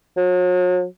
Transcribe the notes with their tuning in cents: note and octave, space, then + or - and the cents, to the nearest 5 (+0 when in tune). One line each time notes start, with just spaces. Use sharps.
F#3 -40